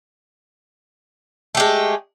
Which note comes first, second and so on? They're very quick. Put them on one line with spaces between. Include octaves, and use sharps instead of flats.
A3 G4 G#3